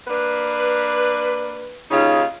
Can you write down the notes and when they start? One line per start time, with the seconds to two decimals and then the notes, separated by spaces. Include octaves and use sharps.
0.08 A#3 D4 B4
1.90 D#2 C#3 D#4 F4